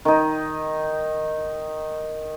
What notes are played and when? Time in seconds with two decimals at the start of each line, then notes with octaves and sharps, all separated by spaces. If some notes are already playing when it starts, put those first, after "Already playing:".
0.05 D#3 D#4